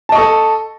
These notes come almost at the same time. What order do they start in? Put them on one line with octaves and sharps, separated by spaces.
A5 D#5 C#6 A4